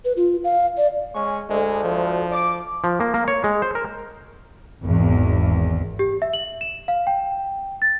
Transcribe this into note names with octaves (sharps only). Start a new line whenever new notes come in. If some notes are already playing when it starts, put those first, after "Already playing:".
B4
F4
F5
D5
G#3 C#4 C#6
D2 G#3
F3
D6
F3
A#3
A#3
C#5
G#3
C5
A#4
G#1 E2
G4
E5
F#7
E7
F5
G5
A6